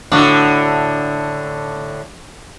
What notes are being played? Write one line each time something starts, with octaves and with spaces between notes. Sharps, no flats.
A2 D3 D4 F#4